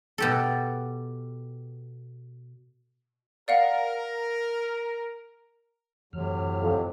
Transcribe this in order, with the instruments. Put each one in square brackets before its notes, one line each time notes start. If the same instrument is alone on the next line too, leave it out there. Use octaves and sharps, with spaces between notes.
[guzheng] B2 G4 A4
[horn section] A#4 [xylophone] D5 F5 F#5
[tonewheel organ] F#2 E3 F6 [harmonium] A2 C3 F#3
[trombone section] F2